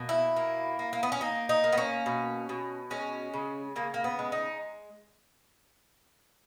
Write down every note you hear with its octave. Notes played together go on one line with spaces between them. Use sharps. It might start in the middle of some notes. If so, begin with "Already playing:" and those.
Already playing: B2 A#3
E4
A#3
A#3
A#3
B3
C#4
A#3 D#4
D#4
A#3
B3
C#4
B2
B2
G#3 C#4
C#3
C#3 A#3
A#3
B3
G#3
D#4